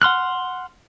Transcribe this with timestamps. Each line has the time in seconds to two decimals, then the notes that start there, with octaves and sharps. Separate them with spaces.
0.02 F#5 C6 F6 F#6